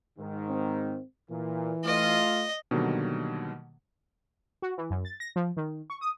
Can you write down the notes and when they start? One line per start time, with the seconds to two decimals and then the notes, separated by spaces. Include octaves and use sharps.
0.19 G#2 D#3
0.49 C4
1.31 A#2 E3
1.85 A3 F4 D#5
2.71 B2 D3 D#3 F#3 G3 A#3
4.62 F#4
4.78 E3
4.90 F#2
5.05 A6
5.20 A#6
5.36 F3
5.57 D#3
5.90 C#6
6.01 D#6